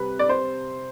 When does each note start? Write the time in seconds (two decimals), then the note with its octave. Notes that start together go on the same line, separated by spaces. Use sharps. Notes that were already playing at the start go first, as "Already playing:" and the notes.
Already playing: C3 G3 B4
0.19 D5
0.29 C5